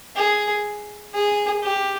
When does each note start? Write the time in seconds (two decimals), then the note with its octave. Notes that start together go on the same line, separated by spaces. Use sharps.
0.16 G#4
1.14 G#4
1.63 G4